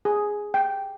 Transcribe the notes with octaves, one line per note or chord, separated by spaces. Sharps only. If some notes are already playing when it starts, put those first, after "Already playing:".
G#4
G5